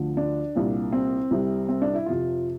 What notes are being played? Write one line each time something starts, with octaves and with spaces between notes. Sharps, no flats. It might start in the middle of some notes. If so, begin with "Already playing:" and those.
Already playing: D2 D3 F3
D4
C2 A#2 G3
C4
C2 C3 G3
C4
D4
E4
F2 C3 F3 F4